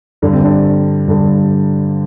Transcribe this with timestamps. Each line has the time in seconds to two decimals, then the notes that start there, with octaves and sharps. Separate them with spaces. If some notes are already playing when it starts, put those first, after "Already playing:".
0.22 G2 D3 D4
0.33 C4
0.43 D4
1.08 G2 D3